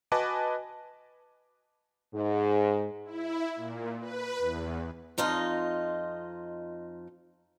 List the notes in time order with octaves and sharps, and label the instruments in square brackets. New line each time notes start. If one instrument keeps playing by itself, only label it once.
[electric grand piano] F#4 B4 D#5 G#5 A5 D6
[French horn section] G#2
[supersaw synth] E4
A#2
B4
E2
[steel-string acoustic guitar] F2 D#4 F4 D#5